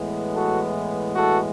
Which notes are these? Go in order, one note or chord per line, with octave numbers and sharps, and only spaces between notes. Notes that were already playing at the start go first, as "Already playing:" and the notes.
Already playing: A2 E3 G#3 B3
F#4 A4
F#4 A4